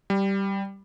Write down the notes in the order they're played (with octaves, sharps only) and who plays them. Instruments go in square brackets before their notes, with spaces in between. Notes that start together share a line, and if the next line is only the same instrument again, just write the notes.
[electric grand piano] G3